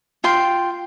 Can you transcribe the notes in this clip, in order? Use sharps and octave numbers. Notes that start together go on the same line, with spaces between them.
F4 G5 C6